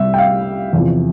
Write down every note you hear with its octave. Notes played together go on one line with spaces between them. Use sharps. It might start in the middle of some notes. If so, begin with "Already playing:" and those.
Already playing: C2 C3 G3 E5
G5
F5
E2 C3 F3